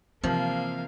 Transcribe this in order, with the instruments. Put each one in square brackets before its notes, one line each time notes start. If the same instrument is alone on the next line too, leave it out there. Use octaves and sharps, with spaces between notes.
[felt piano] C3 [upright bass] E3 [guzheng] F3 [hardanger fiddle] A#3 F5